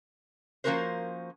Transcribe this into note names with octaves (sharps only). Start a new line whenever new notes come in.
F3 A#3 C#4 F#4 A#4 C5